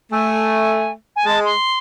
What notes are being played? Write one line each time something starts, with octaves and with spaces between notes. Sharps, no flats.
A3 G#5
G#5
G#3 A5
C6